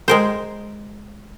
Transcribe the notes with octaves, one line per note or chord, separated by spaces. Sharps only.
G#3 A#4 C5